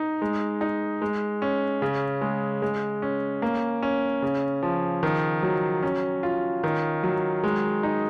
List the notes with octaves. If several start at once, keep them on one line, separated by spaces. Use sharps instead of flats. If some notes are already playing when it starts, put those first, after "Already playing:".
Already playing: D#4
G#3
D#4
G#3
C#4
C#3
G#3
G#3
C#4
A#3
C#4
C#3
F3
D#3
F#3
C#4
F4
D#3
F#3
G#3
D#4